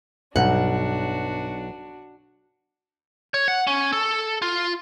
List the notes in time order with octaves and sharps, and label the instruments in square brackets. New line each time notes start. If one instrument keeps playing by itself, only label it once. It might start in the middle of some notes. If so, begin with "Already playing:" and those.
[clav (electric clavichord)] B1 [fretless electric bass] G2 B2 G3 [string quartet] D4 F#4 [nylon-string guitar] F#5
[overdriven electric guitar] C#5
F#5
C#4
A4
F4